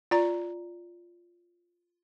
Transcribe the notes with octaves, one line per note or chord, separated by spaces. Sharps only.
F4 D5 A#5